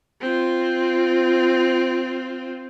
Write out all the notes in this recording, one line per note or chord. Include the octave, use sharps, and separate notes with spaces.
C4 F4